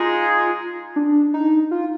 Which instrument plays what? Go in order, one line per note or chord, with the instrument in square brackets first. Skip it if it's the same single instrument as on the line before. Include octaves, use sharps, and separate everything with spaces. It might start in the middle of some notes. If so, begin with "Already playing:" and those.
Already playing: [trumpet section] G#3 D#4 G#4 [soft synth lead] F4
[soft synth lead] D4
D#4
F4